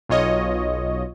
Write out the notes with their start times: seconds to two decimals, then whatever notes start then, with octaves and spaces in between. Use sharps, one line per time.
0.09 B1 F4 C#5 D#5